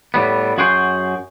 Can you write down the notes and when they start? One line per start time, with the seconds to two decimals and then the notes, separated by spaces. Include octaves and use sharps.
0.14 A2 G3 B3
0.58 F#2 F#4 G#4 F#5 G5 C6